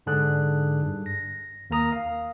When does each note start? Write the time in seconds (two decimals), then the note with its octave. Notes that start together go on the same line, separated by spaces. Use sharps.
0.06 G#2 D3 D4 G#4 F#6
0.83 G2
1.06 A#6
1.70 D#2 A#3 A#4 A#5 D#6
1.92 F5